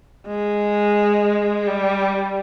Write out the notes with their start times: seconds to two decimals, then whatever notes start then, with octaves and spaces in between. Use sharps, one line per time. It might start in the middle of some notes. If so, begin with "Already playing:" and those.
0.28 G#3
1.68 G3